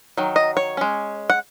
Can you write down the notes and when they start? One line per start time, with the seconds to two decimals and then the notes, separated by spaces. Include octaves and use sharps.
0.17 D#3 F#3
0.36 D#5
0.57 C#5
0.77 G#3 C#4
1.30 F#5